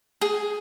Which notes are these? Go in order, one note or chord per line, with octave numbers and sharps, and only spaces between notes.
G#4